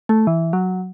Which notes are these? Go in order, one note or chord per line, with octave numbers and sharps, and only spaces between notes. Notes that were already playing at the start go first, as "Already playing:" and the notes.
A3
E3
F#3